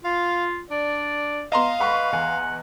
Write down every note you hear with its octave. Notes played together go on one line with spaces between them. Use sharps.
F4 F5
D4 D5
B3 D#5 F5 A#5 C6 E7
B4 F#5 B5 C#6
E2 F#5 G#5